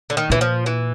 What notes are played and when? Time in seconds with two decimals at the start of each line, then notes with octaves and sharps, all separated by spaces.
0.10 D3
0.17 D#3
0.30 A#2 E3
0.41 F3
0.66 E3